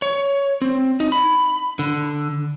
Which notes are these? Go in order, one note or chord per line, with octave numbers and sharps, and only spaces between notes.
C#5
C4
D#4
B5
D3